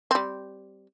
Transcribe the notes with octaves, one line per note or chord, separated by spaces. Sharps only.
G3 C4